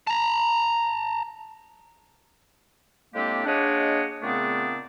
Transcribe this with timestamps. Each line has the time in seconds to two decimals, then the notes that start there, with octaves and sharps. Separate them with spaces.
0.07 A5 A#5
3.15 A2 G#3 A#3 C4 D4 G4
3.46 G#3 A#3 D4 C#5 D#5 F#5
4.23 A#2 C#3 A3 B3 C4 D4